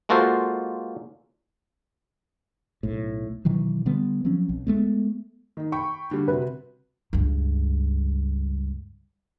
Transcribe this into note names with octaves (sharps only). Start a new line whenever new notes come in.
G#3 A#3 F4 F#4 A4 C5
B1 A2
B2 D#3 E3 F#3
D3 G3 B3
F3 F#3 C4 C#4
B1
G#3 A3 B3
D#3 D#4
G5 B5 C#6
D3 G3
C3 F#4 B4
C#2 G2